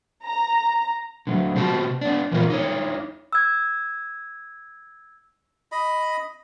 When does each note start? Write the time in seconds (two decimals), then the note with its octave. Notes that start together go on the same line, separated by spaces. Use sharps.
0.24 A#5
1.27 D3 F#3
1.55 C3 C4 F#4 G4 A5
2.01 B3 D4
2.31 E2 A#2 E3 B3 F4 A#4
2.50 D#4 E4 C#5
3.33 E6 G#6
5.72 D#5 B5